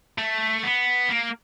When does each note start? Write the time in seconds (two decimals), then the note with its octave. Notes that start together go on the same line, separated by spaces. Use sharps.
0.18 A3
0.63 B3
1.09 A#3